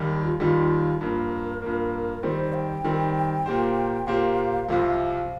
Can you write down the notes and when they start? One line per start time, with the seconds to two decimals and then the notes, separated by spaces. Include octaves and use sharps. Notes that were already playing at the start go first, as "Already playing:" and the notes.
Already playing: D#2 D#3 G3
0.09 G4
0.24 F4
0.39 D#2 D#3 G3 F4
1.01 G2 F3 A#3 A#4
1.62 G2 F3 A#3
2.23 D#3 G3 C4 C5
2.53 G5
2.84 D#3 G3 C4
3.46 A#2 A#3 G4 C5
4.07 A#2 A#3 G4 C5 F5
4.69 C2 C3 F3